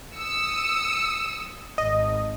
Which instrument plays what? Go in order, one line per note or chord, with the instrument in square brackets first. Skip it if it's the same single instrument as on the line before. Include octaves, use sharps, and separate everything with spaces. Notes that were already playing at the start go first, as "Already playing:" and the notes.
[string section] D#6 E6 C#7
[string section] G#1 [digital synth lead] D#5